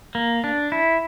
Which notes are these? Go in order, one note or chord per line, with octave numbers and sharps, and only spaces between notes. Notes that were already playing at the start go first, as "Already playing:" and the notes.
A#3
D4
E4